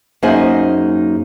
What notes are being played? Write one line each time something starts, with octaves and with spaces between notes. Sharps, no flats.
F#2 A#3 D#4 G#4 C5 D#5